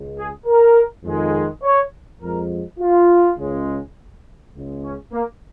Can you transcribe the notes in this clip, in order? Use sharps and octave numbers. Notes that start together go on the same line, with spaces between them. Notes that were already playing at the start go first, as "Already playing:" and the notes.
Already playing: C#2 C#3 G#3
G#4
A#4
F2 D#3 G#3
C#5
F2 F3 G#3 A#4
F4
C#2 C#3 G#3
C#2 C#3 G#3
C#4
A#3